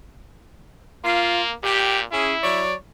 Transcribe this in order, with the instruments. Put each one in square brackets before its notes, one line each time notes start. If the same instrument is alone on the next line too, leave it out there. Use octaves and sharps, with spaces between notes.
[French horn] A#3 [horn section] F4
[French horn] A#2 [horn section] G4
[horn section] C#4 G#4 [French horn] E4
[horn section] F#3 C#5 D5